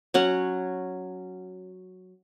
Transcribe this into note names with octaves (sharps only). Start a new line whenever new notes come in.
F#3 C#4 F#5